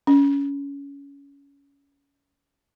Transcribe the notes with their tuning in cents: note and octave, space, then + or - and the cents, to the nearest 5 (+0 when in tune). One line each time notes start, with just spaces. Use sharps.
C#4 +20